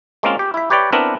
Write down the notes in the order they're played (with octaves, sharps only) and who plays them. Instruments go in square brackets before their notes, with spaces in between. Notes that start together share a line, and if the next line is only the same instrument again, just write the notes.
[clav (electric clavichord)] G#3 A#3 C4 C#4 F4
G4
E4 E5
G4 B4 C#5 D5 G5
B3 C4 D4 E4 A#4 B4